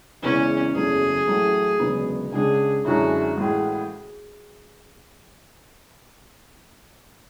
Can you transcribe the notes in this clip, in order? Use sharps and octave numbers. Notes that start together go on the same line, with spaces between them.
E1 E2 C#3 E3 C#4
F#1 E2 C#3 F#3 A3 G#4
A1 A2 F#3 A3
E1 D2 C#3 F#3 B3
C#2 C#3 G#3 D4 G#4
F#2 D3 G#3 C#4 E4 F#4
A1 A2 G#3 G#4